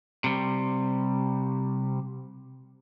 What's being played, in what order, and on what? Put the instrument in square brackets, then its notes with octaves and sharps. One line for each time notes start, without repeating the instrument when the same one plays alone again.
[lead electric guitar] C3 G3